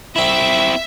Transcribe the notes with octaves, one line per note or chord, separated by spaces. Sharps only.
C4 E4 E5